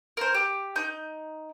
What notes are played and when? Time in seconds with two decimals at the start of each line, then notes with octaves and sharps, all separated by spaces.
0.17 A#4 C5
0.34 G4
0.76 D#4 G6